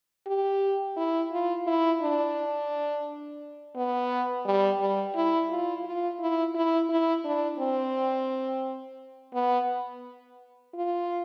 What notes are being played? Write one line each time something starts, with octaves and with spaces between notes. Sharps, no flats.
G4
E4
F4
E4
D4
B3
G3
G3
E4
F4
F4
E4
E4
E4
D4
C4
B3
F4